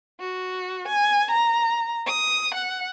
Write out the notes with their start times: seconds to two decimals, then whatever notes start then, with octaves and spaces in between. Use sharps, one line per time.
0.20 F#4
0.88 G#5
1.31 A#5
2.07 D#6
2.54 F#5